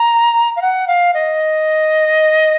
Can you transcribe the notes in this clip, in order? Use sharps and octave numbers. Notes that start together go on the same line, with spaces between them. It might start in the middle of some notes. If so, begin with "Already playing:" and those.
Already playing: A#5
F5
F#5
F5
D#5